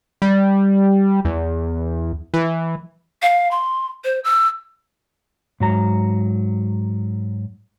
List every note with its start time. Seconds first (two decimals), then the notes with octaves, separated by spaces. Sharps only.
0.22 G3
1.25 E2
2.34 E3
3.22 F5
3.51 C6
4.05 C5
4.24 E6
5.60 G#2 F#3 A#5